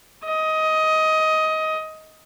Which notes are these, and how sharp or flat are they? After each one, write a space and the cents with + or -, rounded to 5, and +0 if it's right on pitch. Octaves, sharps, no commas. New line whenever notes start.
D#5 +15